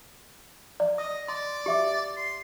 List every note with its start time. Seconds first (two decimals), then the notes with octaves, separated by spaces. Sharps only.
0.80 D5
0.98 D#5 D#6
1.28 D5 C6
1.66 G4 E5 D6
2.17 C6